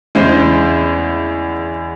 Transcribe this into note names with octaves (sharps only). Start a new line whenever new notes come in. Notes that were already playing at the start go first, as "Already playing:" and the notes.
E2 C#3 G#3 C5